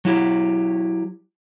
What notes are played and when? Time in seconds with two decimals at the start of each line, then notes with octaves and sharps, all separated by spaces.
0.05 F#3 E4 G4